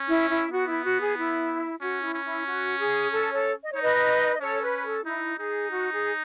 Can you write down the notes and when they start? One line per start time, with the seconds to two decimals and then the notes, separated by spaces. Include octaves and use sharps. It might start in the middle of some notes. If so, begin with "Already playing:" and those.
Already playing: C#4
0.08 E4
0.30 E4
0.52 B3 F#4
0.68 E4
0.84 F#4
1.00 G#4
1.16 E4
1.81 C#4 F#4
2.03 E4
2.14 C#4
2.24 E4
2.46 F#4
2.78 G#4
3.11 A4
3.33 A4 C#5
3.64 D#5
3.73 D#4 C#5
3.82 B4 D#5
4.35 D#5
4.41 C#4 A4 C#5
4.63 B4
4.84 A4
5.06 D#4 E4
5.38 D#4 G#4
5.70 F#4
5.92 G#4